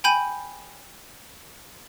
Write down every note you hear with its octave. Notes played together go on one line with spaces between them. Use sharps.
G5 G#5 B5 G6 D#7